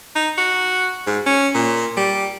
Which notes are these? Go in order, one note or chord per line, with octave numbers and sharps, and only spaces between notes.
D#4
F#4
G#2
C#4
A#2
G3